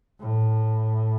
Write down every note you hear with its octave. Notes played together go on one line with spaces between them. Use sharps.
A2